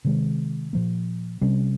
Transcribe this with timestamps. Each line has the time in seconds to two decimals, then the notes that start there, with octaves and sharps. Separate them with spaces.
0.04 C3 D#3 G#3
0.73 A#2 F3 A#3
1.41 C3 G3 C#4